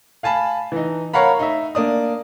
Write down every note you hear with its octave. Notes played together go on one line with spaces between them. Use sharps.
F5 G#5 A5 B5
E3 D#4
A#4 C#5 F5 F#5 A#5 B5
D#4 E5
A#3 D4 D#6